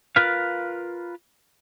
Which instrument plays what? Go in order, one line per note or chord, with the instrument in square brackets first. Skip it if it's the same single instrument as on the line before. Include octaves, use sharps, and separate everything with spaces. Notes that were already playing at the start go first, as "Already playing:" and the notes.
[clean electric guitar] F4 A#4 B4 F5